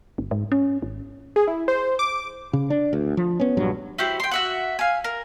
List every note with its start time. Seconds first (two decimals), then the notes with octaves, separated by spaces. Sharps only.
0.18 G1
0.31 G#2
0.52 C#4
0.82 G#1
1.36 G#4
1.47 E4
1.68 C5
1.99 D6
2.53 C#3
2.70 D4
2.93 D2
3.17 F3
3.40 B3 C#4
3.57 A#1 G2 F#3
3.98 E4 F#4 G4 C5
4.20 G5 C6
4.31 F#4 E5 F#5
4.79 F5 G#5
5.04 A#4